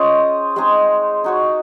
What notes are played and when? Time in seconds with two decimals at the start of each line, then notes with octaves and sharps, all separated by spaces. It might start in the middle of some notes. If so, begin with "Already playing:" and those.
Already playing: G#3 C#4 F4 C5 D#5
0.56 G#3 C4 D#4 G#4
1.24 D#4 F#4 C#5